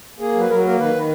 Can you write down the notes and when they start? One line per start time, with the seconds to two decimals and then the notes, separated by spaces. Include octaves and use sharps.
0.20 A#3 G#4
0.35 F#3
0.40 B4
0.49 F#3 A#4
0.64 A#3 A#4
0.78 D#3 B4
0.94 D#3